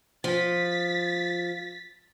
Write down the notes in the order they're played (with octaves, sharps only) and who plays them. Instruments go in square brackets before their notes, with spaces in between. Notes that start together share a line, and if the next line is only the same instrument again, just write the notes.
[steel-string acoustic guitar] F3 [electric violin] A6 B6